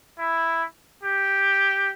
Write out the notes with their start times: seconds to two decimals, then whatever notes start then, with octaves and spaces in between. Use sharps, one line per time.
0.19 E4
1.03 G4